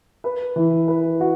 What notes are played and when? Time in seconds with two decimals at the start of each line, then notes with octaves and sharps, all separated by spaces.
0.24 B4
0.56 E3
0.88 B4
1.21 F#4